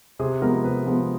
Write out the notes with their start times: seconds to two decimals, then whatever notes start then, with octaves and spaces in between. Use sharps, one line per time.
0.19 C3 G#4
0.42 F3 G#3 B3 A#4
0.64 C3 B4
0.86 F3 G#3 B3